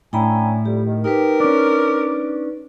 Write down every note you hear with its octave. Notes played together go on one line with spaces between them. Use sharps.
A2 C#4 D4 E4 G5 G#5 A#5 B5
F2 G3 G4
D#3
D#4 G4 A#4 B4
C#4 D4 D6